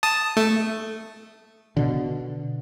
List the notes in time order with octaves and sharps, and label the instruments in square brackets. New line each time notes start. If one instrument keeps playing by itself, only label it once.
[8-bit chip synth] A5 D#6
A3
[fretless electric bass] B2 D3